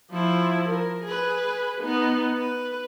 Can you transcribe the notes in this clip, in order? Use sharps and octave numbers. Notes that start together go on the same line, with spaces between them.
F3 E4
A#4
G#4 B4
B3 D#4
B4